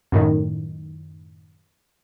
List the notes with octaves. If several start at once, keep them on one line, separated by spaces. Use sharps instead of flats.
F#2 A2 D#3